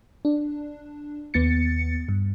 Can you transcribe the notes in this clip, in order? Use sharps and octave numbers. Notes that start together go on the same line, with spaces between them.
D4
D#2 B3 A6 C#7
G2